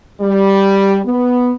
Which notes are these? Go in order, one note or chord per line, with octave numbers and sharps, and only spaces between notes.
G3
B3